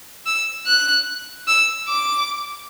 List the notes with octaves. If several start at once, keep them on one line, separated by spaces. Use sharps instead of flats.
E6
F#6
E6
D6